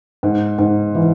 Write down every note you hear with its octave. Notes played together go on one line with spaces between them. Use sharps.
G#2
G#2
E3